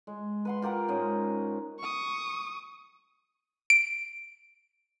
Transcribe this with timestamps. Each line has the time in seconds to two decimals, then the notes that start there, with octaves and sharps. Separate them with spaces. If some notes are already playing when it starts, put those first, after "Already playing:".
0.07 G#3
0.45 B4 F#5 C6
0.62 F4 G4 A#4 F#5
0.88 G#2 C#4 D#5
1.79 C#6 D#6
3.70 D7